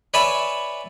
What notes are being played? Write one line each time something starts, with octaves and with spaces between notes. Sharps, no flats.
B4 C#5 D5 E5 G#5 B5